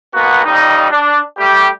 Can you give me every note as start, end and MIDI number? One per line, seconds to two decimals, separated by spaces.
0.14 0.42 35
0.14 0.42 58
0.14 0.42 59
0.14 0.42 66
0.45 0.87 41
0.45 0.87 55
0.45 0.87 63
0.90 1.20 62
1.38 1.68 55
1.38 1.68 57
1.38 1.68 67